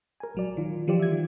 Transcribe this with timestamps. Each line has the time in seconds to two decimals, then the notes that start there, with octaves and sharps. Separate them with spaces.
0.20 A#4 G#5
0.35 A#1 F#3 D5
0.57 D#3 F4
0.88 E3 F3 G3 F4 G4 D5
1.00 E5 G#6
1.12 D#3